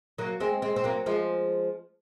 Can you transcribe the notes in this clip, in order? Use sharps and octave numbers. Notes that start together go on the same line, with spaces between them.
F#3 A#3
G#3 C4
G#3 C4
C4
F#3 A#3
F3 G#3